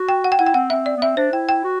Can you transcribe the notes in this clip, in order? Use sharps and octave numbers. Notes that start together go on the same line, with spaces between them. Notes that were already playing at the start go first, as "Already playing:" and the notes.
Already playing: F#4
G5
F#5
G5
E4 F#5
G5
C4 F#5
C4 E5
D5
B3
C4 E5
D4 C5
E4 G5
G5
F#4